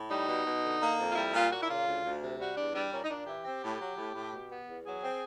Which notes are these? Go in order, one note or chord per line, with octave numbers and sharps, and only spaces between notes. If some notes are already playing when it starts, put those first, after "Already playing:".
Already playing: A2
G3 D#4
B2
B2
D3
A#3
F2
F4
G3 E4
A#2 F4
A#2 F#4
E4
C#3 F4
D2
D2
C3
G3 F#4
E2 D4
G3 D4
A#2 C#4
D#4
A#2 D4
E3 G4
C4
A2
F#3
A2
A2
B2
B3
E2
F#3 G#4
C4